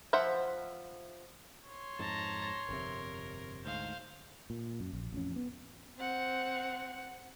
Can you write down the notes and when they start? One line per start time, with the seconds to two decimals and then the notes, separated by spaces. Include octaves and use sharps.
0.13 F3 C5 E5 F#5
1.68 C#5 C6
1.99 F2 G#2 A5 A#5
2.69 G1 F2 C3 A#4
3.65 D2 G#2 C5 F5
4.50 A#2
4.80 F#2
4.93 A#1
5.12 A1 F2 C#4
5.36 B3
5.98 C4 F#5